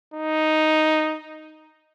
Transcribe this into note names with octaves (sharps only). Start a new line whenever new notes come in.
D#4